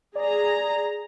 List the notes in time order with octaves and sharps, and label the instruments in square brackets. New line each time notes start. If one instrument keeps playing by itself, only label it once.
[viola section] G#4 A#5 [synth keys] D5